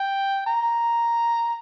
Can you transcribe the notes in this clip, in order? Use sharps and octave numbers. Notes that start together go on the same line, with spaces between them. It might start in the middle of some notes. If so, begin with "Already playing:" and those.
Already playing: G5
A#5